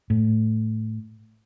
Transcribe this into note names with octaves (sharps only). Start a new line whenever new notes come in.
A2